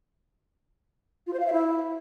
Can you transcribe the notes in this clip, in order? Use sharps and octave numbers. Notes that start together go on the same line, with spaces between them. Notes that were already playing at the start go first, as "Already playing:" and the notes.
F4
C5
F5
E5
E4